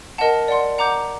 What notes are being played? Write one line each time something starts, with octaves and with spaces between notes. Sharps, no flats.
A#4 D#5 F#5 A5
D5 F#5 C6
F#5 A#5 D6 G6